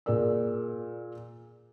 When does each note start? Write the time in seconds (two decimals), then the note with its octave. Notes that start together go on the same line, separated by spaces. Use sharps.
0.06 A#2 G#4 A#4 D5 E6